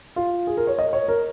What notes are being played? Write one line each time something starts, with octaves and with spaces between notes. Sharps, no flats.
F4
G#4
A#4
C#5
D#5
C#5
A#4